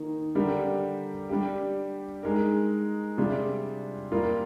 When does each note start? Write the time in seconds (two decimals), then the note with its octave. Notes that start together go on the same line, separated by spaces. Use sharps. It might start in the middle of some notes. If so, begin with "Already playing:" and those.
Already playing: D#3 A#3 D#4
0.35 D3 G3 D4 G4 A#4
1.29 G3 D4 G4
2.23 G#3 D#4 A#4
3.17 C3 G3 D4 F4 G#4
4.11 G3 A#3 F4 A#4